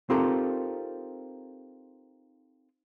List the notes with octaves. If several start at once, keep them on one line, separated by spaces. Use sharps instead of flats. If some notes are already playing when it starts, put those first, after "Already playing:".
C4 D#4 F4 G4 A4 A#4